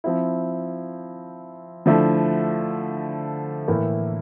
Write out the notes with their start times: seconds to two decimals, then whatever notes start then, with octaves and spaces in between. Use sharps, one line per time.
0.04 F3 C4 E4
1.86 D3 F3 A3 E4
3.68 A2 E3 A#3